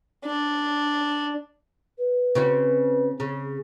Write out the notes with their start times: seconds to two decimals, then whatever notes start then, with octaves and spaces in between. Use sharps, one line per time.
0.25 D4
1.98 B4
2.35 C#3 C4 F#4
3.20 C#3 G#4